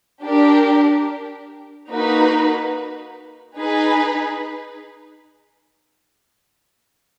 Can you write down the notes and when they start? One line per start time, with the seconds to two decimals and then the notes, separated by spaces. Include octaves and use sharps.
0.22 D4 G4 A#4
1.90 A#3 D#4 F#4 B4
3.57 D#4 G#4 B4